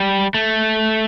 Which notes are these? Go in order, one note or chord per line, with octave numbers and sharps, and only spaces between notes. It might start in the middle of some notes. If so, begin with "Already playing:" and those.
Already playing: G3
A3